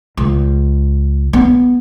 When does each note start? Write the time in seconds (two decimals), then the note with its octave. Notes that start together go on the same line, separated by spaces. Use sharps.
0.17 C#2
1.33 B3